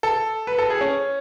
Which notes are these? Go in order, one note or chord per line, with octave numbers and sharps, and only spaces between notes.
A4
B4
A4
G#4
C#4